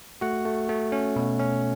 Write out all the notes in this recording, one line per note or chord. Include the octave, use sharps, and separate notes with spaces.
A3 F#4 F#5
A3
A3
C#4
B2
C#4